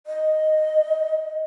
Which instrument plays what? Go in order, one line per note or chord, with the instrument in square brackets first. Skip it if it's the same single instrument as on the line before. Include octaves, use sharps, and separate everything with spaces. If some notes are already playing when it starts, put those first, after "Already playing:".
[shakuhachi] D#5